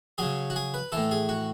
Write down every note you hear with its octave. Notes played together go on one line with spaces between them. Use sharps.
C#3 F#3 G#4
F#4
G#4
B4
A2 E3 A4
G#4
F#4